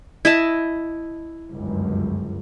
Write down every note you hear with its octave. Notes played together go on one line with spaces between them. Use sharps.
E4 D#5 A5
G1 C#2 F#2